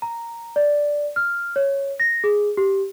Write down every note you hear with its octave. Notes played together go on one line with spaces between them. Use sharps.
A#5
D5
F6
C#5
A#6
G#4
G4